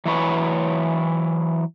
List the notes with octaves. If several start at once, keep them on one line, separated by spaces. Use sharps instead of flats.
E3 F#3 B4 C#5